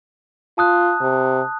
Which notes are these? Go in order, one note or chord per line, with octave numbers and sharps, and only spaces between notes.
F4 A5 D#6 F#6
C3